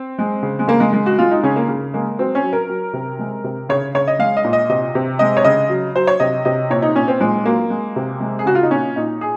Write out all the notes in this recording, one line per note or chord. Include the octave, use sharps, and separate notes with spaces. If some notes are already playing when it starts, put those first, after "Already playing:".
Already playing: C4
G#3
C#3
G#3
C#3 A#3
G#3
G#3
F#4
G#3 F4
D#4
C#3 C#4
A#3
C#3
G#3 A#3
F#3 C4
C#4
F#3
A#4
F#3
C3
G#3
C3
C#3 C#5
C#3 C#5
D#5
G#3 F5
D#5
A#2
D#5
C3 D#5
C3
G#3 D#5
C#5
C#3 D#5
F#3
F#3 C5
C#5
C3 D#5
C3 D#5
A#2 C#5
D#4
A#2 C#4
C4
A#2 G#3
F#3 A#3
G#3
C3
G#3
G#4
C#3 F#4
F4
D#4
A#2 C#4
A#2 D#4
G#4